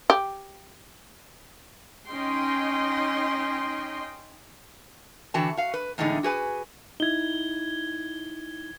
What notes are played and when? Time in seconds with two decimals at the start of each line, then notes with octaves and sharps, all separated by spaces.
0.10 G4
2.07 C#4 D#4 D#5 G5 C6
5.34 D3 E3 F#4 G5 A5
5.57 F#4 F5
5.74 B4
5.98 E2 A2 D3 G#3 D#4
6.23 F#4 G#4 B4 G#5
7.00 D#4 E4 G#6 G7